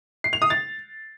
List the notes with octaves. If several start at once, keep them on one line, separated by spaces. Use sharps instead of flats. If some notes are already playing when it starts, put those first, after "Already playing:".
C7
F7
D#6
A6